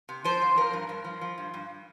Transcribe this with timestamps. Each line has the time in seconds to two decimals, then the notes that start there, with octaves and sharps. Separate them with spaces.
0.09 C3
0.24 F3 C5
0.42 F2
0.56 F3 A#4
0.73 G2
0.89 G2
1.04 F3
1.21 F3
1.38 G2
1.54 G2